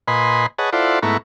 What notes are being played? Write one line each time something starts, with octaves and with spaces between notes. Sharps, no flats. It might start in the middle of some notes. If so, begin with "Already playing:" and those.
A#2 B4 D#5 G#5 B5 C6
G#4 B4 C#5 D#5 F#5 A5
E4 F4 A4 C5 D5 F#5
G#2 A3 B3 E4 A#5 C#6